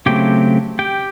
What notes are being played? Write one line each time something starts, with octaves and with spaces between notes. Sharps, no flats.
C#3 F#3 A3 C4 G4 G5
G4 G5